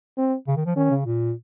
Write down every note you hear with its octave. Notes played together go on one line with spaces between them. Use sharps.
C4
C#3
D#3
F3
D#3 C#4
C#3
A#2